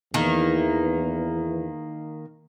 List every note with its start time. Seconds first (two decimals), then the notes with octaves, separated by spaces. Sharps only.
0.14 E2 D#3 E3 A#3